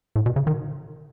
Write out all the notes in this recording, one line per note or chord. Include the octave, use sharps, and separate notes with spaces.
A2
B2
C#3
D#3